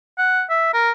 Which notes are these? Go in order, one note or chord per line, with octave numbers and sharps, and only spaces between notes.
F#5
E5
A#4